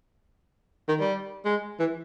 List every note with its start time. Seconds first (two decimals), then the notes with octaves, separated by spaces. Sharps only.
0.88 D#3
1.00 G3
1.45 G#3
1.79 E3